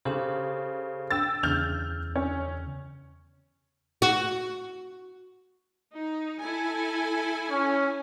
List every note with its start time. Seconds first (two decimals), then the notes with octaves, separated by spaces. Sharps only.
0.05 C#3 G4 A4 C5
1.11 G5 E6 A6
1.43 E2 C#3 F6 G6 F7
2.16 C#4
4.02 F#4
5.94 D#4
6.40 E4 A4 G#5
7.51 C#4